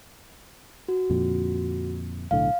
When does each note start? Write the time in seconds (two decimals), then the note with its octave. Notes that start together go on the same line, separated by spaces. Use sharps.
0.88 F#4
1.10 F2 A#2 D3
2.31 B1 A2 D3 F5